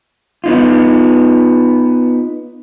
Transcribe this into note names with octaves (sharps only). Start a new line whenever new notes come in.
B3 D#4 F4